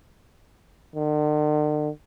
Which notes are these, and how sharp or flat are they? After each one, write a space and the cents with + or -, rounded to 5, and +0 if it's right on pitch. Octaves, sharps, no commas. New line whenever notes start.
D3 +45